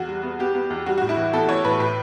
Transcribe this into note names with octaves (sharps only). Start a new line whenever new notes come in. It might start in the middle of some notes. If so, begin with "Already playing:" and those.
Already playing: E2 F#4
G3
B3
B3 G4
B3
E2
G3 F#4
A2 F#4
E4
E3
B3 A4
E3 C#5
A2 B4
A2 B4